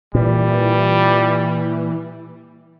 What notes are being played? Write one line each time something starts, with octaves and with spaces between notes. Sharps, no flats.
A#2 E3 G3